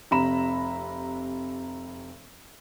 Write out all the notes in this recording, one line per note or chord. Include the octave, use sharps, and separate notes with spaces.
F1 C3 A#5 B5 E7